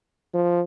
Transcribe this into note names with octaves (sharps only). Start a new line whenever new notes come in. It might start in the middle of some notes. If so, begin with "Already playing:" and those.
F3